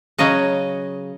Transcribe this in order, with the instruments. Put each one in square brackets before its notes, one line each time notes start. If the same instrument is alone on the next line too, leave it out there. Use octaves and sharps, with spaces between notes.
[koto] C#3 F#3 C#4 D#5